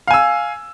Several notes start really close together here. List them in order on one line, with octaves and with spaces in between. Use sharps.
F5 G#5 E6